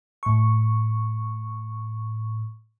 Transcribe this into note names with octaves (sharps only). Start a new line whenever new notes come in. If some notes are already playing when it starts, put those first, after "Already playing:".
A2 C#6